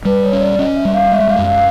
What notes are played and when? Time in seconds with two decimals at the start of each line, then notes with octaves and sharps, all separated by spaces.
0.05 G3 B4
0.23 C#5
0.33 C#4
0.40 D5
0.59 C#4 D#5
0.76 E5
0.85 G3
0.94 F5
1.12 G#3 E5
1.29 F5
1.38 F#2
1.47 F5